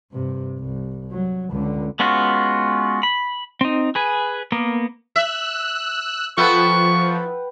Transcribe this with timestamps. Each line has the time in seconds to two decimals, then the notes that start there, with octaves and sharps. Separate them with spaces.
0.12 G2 C3
0.59 C2
1.12 F#3
1.50 C#2 D3
1.99 G#3 B3 C#4 F4 F#4
3.03 B5
3.61 C4 D#4
3.95 G#4 B4 G#5
4.52 A#3 B3 A#4
5.16 E5 E6 F#6
6.37 F3 B3 E4 A4 B4 F#5 G5 C#6